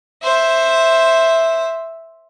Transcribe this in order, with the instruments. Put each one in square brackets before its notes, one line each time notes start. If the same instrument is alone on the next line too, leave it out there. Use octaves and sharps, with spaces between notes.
[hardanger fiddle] C5 E5